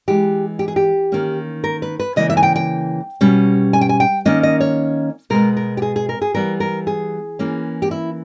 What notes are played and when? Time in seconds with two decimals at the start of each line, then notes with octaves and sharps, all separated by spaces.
0.08 E3 G#3 B3 G4
0.59 G4
0.68 G#4
0.76 G4
1.12 D#3 A#3 C#4
1.64 A#4
1.82 B4
2.00 B4
2.16 C#3 E3 A#3 D#5
2.30 E5
2.37 G#5
2.43 G5
2.56 G5
3.21 B2 G3 C#4
3.73 G#5
3.81 G5
3.89 G#5
4.00 G5
4.25 D#3 A#3 C#4 D#5
4.43 D#5
4.60 C#5
5.30 B2 G#3 B3 A#4
5.57 A#4
5.77 G4
5.82 G#4
5.96 G#4
6.09 A#4
6.22 G#4
6.34 E3 G3 B3 A#4
6.60 A#4
6.87 G#4
7.39 E3 A#3 C#4
7.82 G4
7.91 E4